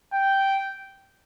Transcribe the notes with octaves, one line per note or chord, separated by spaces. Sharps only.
G5